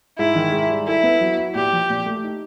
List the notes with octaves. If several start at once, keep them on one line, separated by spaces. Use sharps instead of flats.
G#2 E4
D#3
G#2
G3
E4 A4
B3
F#3
E4
A#2 G4
F3
A#2
A3
D#4